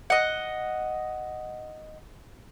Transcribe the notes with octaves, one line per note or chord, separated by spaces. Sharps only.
D#5 F#5